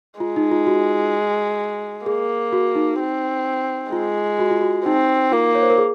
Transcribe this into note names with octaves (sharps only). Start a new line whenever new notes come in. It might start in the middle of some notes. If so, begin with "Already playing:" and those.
G#3 F4
D#4
F4
F#4
A#3 G#4
F#4
D#4
C4
G#3 F4
F#4
F4
F#4
C4 D#4
A#3 F4
C#5
C5
A#4
G#4